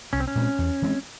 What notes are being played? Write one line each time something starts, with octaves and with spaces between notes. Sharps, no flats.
C2 C#4
C4
C#4
A#2 G#3 C4
E2
E3 G#3 C4